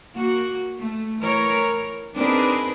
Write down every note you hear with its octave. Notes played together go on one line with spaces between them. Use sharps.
A#3 F#4
A3
E3 A#4 C#5
C4 D4 D#4 G#4 A#4 B4